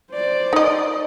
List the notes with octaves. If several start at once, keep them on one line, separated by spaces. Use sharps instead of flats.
C5 D5
D#4 D#5